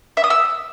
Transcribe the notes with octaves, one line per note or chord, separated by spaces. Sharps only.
E5
D#6
E6